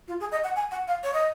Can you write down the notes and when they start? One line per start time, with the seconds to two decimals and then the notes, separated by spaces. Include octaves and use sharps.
0.08 F4
0.20 G#4
0.32 D#5
0.44 F#5
0.56 G#5
0.71 F#5
0.88 F5
1.03 C#5
1.14 D#5